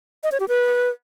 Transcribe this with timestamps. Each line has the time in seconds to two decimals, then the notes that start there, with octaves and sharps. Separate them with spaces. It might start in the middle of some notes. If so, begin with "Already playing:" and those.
0.23 D#5
0.32 C#5
0.40 G4
0.48 B4